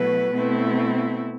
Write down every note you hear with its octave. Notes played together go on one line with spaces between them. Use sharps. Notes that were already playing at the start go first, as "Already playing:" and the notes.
Already playing: B2 F#3 A3 E4 B4
B2 A3 C4 E4